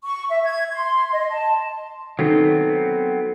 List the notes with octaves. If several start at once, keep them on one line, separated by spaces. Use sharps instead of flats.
C#6
E5
G#6
C6
D#5
A5
D#3 F#3 B3 C4 A4